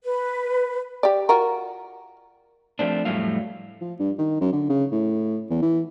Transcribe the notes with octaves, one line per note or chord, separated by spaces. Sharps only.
B4
G4 D5
F4 F#4 A#4
F3 A3 C4 D4
F2 A2 F#3 G3 A3 F5
F3
G2
D#3
F#2
D3
C#3
A2
E2
E3